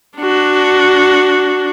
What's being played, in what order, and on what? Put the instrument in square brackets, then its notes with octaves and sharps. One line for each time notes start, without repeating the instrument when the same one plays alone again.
[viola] D4 F#4